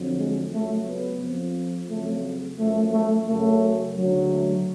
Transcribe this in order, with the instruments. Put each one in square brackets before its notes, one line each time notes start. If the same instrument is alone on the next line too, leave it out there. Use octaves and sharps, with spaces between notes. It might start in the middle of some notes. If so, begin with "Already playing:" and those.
Already playing: [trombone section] F2 D3 F#3
G#3
C#2 C#3 F#3 A3
B3
F2 F3
F2 C#3 F#3 A3
F#2 F3 A3
A3
F#2 C#3 F#3 A3
D2 C#3 F#3
A3